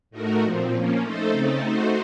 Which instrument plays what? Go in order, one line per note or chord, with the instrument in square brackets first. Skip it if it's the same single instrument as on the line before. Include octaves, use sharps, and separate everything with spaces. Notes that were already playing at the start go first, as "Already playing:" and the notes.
[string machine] A2 A3 D#4 F#4 A#4
A#2 F3 C4
F3 A#3 C#4
A3 D#4 A4 C5
C#3 A3 C4 D#4 A4
A3 D#4 F#4 C5